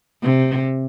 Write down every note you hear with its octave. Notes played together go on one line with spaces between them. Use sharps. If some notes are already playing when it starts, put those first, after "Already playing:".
C3